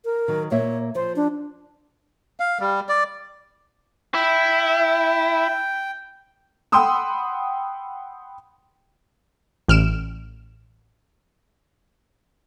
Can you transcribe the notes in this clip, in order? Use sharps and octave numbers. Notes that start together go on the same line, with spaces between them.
A#4
D#3 F#3
A#2 A#3 C#5 E5
F3 C5
D4
F5
G3
D5
E4 G5
F#5 G5 B5 C6 D#6 E6
A1 F6 D7 E7